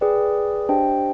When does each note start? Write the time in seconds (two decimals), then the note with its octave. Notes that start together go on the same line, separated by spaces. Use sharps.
0.01 G#4 B4 D5 G5
0.69 D4 G4 C5 D#5 G5